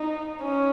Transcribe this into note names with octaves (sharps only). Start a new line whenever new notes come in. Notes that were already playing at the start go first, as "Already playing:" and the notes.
Already playing: D#4
C#4